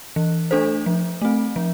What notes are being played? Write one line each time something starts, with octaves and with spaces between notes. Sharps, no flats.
E3
A3 D4 A4 C5
F3
A3 C4
F3